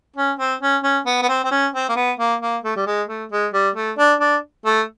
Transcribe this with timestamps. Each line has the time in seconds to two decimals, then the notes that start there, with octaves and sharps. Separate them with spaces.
0.16 C#4
0.39 C4
0.61 C#4
0.83 C#4
1.06 B3
1.22 B3
1.29 C4
1.45 C4
1.51 C#4
1.74 C4
1.89 A#3
1.96 B3
2.19 A#3
2.41 A#3
2.63 A3
2.76 G3
2.86 G#3
3.08 A3
3.31 G#3
3.53 G3
3.75 A3
3.98 D4
4.20 D4
4.66 A3